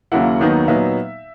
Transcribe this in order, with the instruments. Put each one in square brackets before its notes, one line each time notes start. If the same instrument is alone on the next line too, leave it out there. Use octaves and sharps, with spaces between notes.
[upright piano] D#2 C#3 F#3 A#3 E4 F#5
D#2 D#3 F#3 B3 D#4
A#2 F#3 B3 D#4 E5